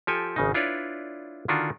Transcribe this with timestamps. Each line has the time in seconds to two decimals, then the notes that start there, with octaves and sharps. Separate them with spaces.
0.07 F3 G4 A4 G#5
0.36 G#1 C#3 D#4
0.54 D4 E4 F4 B4 C#5 D5
1.48 D3 D#3 D4 F4 F#4